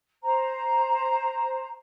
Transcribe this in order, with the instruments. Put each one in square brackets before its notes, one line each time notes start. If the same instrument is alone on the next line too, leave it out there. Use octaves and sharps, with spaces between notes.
[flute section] C5 A#5